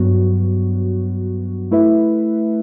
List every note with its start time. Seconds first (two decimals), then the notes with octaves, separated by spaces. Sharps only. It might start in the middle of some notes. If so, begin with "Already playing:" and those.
Already playing: G2 F#3 B3 F#4
1.71 A3 E4 B4 E5